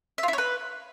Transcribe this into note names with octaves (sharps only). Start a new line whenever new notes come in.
E5
F4
E4
C#5
B4